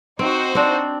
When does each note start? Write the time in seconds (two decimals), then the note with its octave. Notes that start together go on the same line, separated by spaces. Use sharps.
0.19 C4 D#4 F#4 C5
0.55 C4 D4